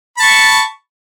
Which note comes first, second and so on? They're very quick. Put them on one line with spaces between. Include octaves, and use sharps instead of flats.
B5 A5 C#6